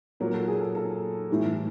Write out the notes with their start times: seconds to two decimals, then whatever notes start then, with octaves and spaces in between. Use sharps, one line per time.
0.20 A#2 F#3 A#3 A#4
0.34 A4
0.48 G#4
0.61 A4
0.75 A4
1.29 A2 E3 G3